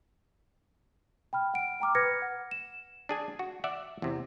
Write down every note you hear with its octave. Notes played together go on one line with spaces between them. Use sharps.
G5 B5 F6
F#5 D7
G5 A#5 D6 F6
B4 B5 F6 G#6 A#6 C#7
F#5
E7
D4 G#4 G#5
F#4
D5 E5 F#5
E2 C3